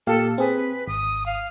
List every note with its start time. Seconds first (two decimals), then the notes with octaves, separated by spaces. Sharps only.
0.07 A#2 G4 A4 F5
0.38 C4 G#4 B4
0.88 G#1 D#6
1.26 F5